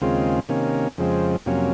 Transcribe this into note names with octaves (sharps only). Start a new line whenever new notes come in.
D#2 C#3 G#3 C4 F4
C3 D#3 A#3 C#4
F2 C#3 F3 G#3 C4
F2 C3 F#3 A#3 C#4